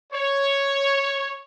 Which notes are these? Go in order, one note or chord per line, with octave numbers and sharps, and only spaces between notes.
C#5